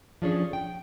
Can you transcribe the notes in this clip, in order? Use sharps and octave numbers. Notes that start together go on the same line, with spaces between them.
F3 C#4 D4 G#4 A4 C#5
G5